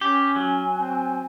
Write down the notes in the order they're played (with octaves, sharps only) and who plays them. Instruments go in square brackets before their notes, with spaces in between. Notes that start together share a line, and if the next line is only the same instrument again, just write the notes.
[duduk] C#4 [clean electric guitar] G4 [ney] G#5
[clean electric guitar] F#3
[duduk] C4